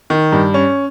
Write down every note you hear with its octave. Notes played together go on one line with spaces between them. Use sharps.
D#3
G2
C#4